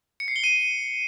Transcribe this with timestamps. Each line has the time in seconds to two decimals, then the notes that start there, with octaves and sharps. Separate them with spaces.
0.20 C#7
0.28 C7
0.36 G7
0.44 D#7